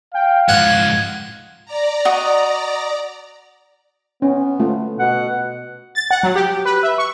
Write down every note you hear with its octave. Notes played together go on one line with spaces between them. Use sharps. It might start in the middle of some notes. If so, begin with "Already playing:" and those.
F5 G5
G#2 F3 F#5 G#6
D5 A#5
F#4 D#5
B3 C#4
A3 F4
B2 F#5
A6
F#5
F#3
G4
B4
E5
C#6